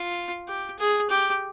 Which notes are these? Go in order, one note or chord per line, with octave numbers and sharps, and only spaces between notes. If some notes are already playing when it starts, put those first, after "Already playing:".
Already playing: F4
G4
G#4
G4